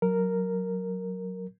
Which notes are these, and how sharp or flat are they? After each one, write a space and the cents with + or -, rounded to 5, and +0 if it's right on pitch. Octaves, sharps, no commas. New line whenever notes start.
F#3 +0 A#4 -5